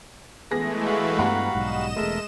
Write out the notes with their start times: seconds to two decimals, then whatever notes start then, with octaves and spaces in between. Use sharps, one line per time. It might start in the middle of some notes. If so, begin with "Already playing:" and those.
0.51 E3 G#3 A3 B3 G#4 A#6
0.85 F#4 F5 B5
1.19 G2 G3 B3 F#5 A#5
1.55 B1 G#2 D#5 E7
1.96 E1 G#3 A3 A#4 E5 A5